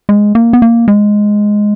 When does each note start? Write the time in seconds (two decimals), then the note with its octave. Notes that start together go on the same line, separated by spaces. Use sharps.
0.09 G#3
0.35 A#3
0.53 B3
0.62 A#3
0.88 G#3